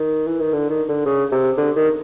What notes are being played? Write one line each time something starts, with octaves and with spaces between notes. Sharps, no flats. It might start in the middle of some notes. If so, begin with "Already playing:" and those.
Already playing: D#3
E3
D#3
D3
D#3
D3
C#3
C3
D3
D#3